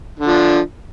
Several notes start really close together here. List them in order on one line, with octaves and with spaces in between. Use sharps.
D3 D4 F3